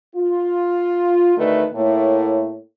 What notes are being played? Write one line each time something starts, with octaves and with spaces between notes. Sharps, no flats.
F4
D2 D#3 A3 B4 D5
A2 A3 A#3 E4 C#5